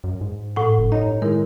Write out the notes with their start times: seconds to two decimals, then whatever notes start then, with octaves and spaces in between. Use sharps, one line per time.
0.04 F#2
0.21 G#2
0.56 A2 F#5
0.78 F#1
0.92 G2 D#4 C#5 D#5
1.22 D#3 G#3 E4 A#4